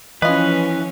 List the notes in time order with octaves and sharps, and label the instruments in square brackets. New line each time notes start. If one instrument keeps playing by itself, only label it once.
[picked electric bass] E3 [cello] F3 C#4 [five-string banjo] F4 D#5 [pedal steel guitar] B4